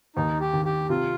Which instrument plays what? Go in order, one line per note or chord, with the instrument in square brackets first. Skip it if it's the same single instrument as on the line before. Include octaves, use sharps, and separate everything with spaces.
[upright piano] D#2 [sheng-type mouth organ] D#4
[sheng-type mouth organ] G4
[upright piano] D#3
[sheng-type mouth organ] G4
[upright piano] C3 [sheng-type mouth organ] F4